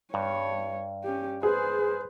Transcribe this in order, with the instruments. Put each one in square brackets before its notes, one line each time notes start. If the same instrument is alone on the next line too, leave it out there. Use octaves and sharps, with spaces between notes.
[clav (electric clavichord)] G2 [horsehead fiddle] G3 C#5
[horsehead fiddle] C#4 G4
[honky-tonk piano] G#4 [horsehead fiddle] B4 C5